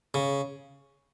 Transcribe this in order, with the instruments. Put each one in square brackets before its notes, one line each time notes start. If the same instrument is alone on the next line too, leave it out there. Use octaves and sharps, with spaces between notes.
[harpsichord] C#3